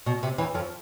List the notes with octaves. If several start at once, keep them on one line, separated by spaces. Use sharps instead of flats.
B2
C3
E2 E3
F2 F3